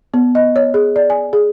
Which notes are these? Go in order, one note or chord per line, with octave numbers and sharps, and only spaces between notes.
B3
D#5
C#5
G#4
D5
G#5
G#4